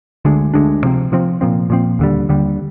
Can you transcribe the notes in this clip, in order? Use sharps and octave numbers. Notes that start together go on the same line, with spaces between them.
D2 D3 G#3 D4
D2 D3 G#3 D4
C3 F3 C4
C3 F3 C4
A#2 F3 C4
A#2 F3 C4
D#2 D3 G3
D#2 D3 G3